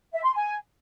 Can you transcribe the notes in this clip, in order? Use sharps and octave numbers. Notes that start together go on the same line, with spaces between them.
E5
C6
G#5